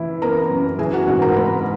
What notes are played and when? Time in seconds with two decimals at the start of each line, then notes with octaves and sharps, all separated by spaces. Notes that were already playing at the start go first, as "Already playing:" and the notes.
Already playing: E3 E4
0.22 B3 A#4 A#5
0.51 F#2
0.79 E3 G#4 G#5
0.93 F#4 F#5
1.07 G#2 F#4 F#5
1.22 A#4 A#5
1.36 G#3 B4 B5